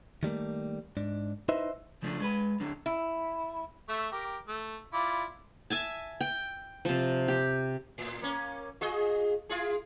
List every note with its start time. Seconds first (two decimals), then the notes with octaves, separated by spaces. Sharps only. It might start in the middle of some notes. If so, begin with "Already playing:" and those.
0.23 D#3 G3 A3 A#3
0.97 G#2 D4
1.49 D#4 E4 B4 C5 D#5 E5
2.02 C#3 F3 A3 D4
2.20 G#3 B4 B5
2.60 D3 F#3 D4
2.86 E4
3.89 A3 E5 C#6
4.12 G4 A#4
4.48 A3
4.94 E4 F4 D5
5.70 E5 G#5 A5
6.21 G5
6.85 C3 F3
7.28 G4
7.98 A2
8.22 A#3 C#4
8.81 F4 G#4 D#5
9.49 E4 F4 G#4